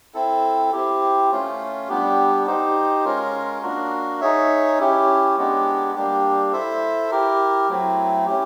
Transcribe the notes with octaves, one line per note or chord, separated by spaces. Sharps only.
C4 E4 A4
C4 E4 G4
A3 C#4 F4
G3 B3 D4 G4
D#4 G4 C5
G#3 C#4 F4 A#4
A#3 D4 F#4 A#4
D#4 G#4 C#5 E5
C#4 E4 G4
G#3 B3 D4 G4
G3 A#3 D4 G4
E4 A4 C5 E5
E4 G4 A#4
F#3 A3 C4 E4
C#4 E4 G4